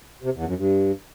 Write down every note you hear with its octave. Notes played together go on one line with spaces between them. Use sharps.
C3
E2
F#2
G2